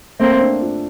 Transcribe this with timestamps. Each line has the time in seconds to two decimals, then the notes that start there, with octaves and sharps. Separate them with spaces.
0.20 A3 A#3 C4
0.41 D4
0.62 F4